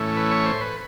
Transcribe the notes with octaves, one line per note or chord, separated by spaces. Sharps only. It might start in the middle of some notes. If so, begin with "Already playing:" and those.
Already playing: A2 E3 A3 C#4
B4
C#5
C5
B4